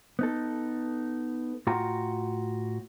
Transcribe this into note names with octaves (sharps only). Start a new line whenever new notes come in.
B3 D#4 A4
A2 F4 F#4 G5 A#5